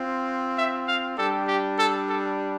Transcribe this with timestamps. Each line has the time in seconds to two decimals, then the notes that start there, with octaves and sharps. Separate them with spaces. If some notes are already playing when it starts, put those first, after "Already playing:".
Already playing: C4 F4
0.56 E5
0.86 F5
1.17 G3 D4 G4 A4
1.47 G4
1.77 A4
2.07 A4